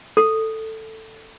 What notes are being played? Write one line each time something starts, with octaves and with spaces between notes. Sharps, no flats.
A4